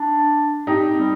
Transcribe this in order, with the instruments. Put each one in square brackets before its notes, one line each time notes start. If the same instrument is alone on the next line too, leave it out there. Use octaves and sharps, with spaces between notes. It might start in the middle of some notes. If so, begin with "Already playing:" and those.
Already playing: [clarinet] D4
[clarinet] C4 [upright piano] D#4 G4
[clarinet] G3